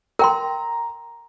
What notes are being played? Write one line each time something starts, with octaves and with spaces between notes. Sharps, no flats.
A#4 G5 A#5 C6